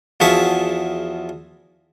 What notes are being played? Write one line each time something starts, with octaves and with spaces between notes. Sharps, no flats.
E2 F3 F#4 G#4 E5 A5